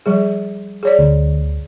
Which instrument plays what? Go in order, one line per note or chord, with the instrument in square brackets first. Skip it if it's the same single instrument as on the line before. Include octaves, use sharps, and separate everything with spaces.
[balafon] F3 G3 G#4
G#4 C#5 D5
[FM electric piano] D2